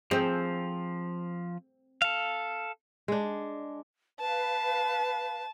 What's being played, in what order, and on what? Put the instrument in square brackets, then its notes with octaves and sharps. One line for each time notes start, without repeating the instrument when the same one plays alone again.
[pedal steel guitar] F3 [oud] C4 G#4
[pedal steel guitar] A4 F5
[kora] G#3 D4
[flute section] B4 F5 [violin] A5